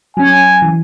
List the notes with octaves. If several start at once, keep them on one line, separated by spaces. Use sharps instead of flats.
F#3 C#4 G#5
E3